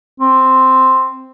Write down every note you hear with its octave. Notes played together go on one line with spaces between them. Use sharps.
C4